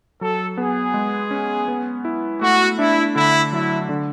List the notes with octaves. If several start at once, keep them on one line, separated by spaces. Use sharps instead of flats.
F#3 A4
B3 G#4
G#3
C#4
B3
E4
A3 F#4
D4 E4
D3 E4
F#3 E4
D3